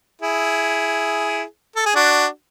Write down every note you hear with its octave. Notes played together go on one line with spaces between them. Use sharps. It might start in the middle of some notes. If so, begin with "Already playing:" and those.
E4 G#4
A4
G#4
D4 F#4